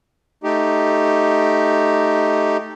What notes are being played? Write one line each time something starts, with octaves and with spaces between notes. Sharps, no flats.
A3 D#4 G4